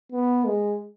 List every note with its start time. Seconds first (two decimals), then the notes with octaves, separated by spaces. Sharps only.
0.12 B3
0.46 G#3